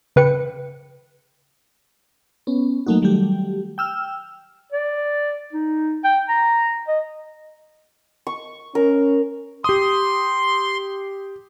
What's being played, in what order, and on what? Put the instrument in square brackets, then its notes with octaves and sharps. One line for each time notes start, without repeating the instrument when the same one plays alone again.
[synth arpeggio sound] C#3 B4 G5 C#7
[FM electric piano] B3 C#4
F#3 A3 A#3 D#4 F#4
D#3 F#3 G3 A3 G4
G5 E6 F6
[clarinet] D5
D#4
G5
A#5
D#5
[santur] C#6
[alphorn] C#4 [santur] A#4
[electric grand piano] G4 D#6 [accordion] C6